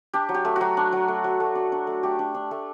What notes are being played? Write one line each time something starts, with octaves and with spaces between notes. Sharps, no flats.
D4 G4
F#3
G4
A3
F#3 F#4
D4
F#3
A3
F#3
A3
D4
D4
A3
A3 G4
D4
D4
A3